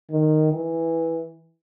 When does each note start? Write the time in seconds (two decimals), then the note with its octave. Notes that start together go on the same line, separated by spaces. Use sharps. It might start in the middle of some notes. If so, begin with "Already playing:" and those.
0.10 D#3
0.52 E3